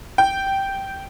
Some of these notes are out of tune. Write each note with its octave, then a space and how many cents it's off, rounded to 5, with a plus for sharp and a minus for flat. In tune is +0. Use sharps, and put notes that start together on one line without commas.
G5 -10